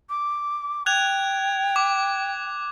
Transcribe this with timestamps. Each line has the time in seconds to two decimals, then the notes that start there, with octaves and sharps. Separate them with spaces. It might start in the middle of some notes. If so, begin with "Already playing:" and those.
0.09 D6
0.86 G5 F#6 G#6 F7
1.76 D6